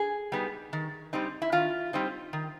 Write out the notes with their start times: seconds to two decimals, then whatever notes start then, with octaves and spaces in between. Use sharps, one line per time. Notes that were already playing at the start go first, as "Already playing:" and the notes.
Already playing: G#4
0.32 G3 B3 D#4
0.73 D#3
1.13 G3 C4 D#4
1.42 E4
1.52 D#3 F4
1.93 G3 C4 D#4
2.33 D#3